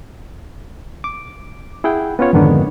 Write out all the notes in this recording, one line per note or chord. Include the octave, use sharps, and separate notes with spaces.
D6
E4 G#4 F#5 G5
B3 C#4 F4 C#5
F2 G#2 D3 D#3 B3 D4